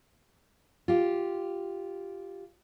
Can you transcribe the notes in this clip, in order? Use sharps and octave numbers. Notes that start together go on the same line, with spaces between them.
F4 G4